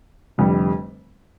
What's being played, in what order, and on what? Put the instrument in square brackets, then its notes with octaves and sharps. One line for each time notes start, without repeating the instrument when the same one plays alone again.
[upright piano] F1 F2 D3 G3